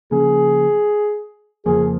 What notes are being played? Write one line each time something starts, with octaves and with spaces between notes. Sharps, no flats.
C#3 F3 A#3 C#4 G#4
F2 C#3 F3 A#3 G#4